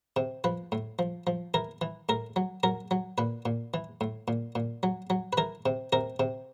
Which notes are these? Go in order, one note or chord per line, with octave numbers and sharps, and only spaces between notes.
C3
F3 B4
A2
F3
F3
E3 A#4
E3
A2 A#4
F#3
F#3 A#4
F#3
A#2 B4
A#2
E3
A2
A#2
A#2
F#3
F#3
B4
E3 A#4
C3
C3 A#4
C3